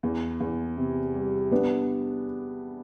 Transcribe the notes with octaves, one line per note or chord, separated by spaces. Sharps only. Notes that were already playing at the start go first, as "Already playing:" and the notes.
E2
E2
C3
G3
B3 D4